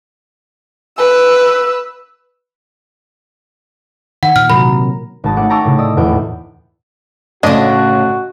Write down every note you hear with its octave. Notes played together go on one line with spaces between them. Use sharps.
B4 E6
D#3 F#5
A#2 F6
C3 F#3 A#4 B5
G#1 A5 D#6
A3 C#4 F#5 D6
G5 A5 A#5 C#6 D6 E6
A2 C#3
D5 D#5 D#6 E6
D#1 E2 A2 G5
A2 C#3 G#3 D4 F#4 D#5